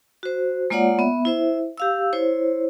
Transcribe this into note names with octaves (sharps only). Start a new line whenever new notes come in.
F#4 C5
G#3 A#3 F4 C#5 D5 F#5
B3 E5
E4 C5 E5
G4 F5 E6
E4 C5 C#5